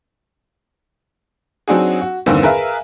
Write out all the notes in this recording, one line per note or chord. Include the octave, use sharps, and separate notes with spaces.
F#3 C4 D4 D#4 F#4 G#4
F#4
E2 G2 D3 D#3 A#3 C4
G#4 A#4 B4 E5 F5